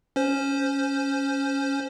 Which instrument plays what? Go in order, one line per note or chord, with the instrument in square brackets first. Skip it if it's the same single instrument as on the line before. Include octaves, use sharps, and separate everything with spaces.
[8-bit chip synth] C#4 C5